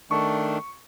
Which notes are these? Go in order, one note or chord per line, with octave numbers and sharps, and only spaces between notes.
D#3 A3 D4 C#6